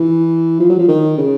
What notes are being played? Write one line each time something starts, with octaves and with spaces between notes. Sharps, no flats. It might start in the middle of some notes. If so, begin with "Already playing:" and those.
Already playing: E3
F3
F#3
F3
D#3
C#3